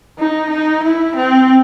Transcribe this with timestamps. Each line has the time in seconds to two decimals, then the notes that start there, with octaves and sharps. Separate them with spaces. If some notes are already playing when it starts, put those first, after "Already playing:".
0.18 D#4
0.50 D#4
0.83 E4
1.15 C4